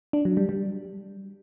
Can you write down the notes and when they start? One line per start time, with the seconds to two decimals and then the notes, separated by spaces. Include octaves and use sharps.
0.13 D4
0.25 F#3
0.37 G3
0.49 G3